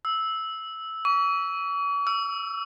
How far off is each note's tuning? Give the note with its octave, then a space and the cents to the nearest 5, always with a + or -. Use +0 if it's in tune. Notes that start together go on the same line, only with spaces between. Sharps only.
E6 -10
C#6 +45
E6 +30